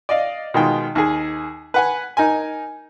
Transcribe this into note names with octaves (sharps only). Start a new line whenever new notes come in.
D5 D#5 F5
B2 D#3 G#3 F4 G5
D#2 G#4
B4 F#5 G#5
D#4 A#4 G#5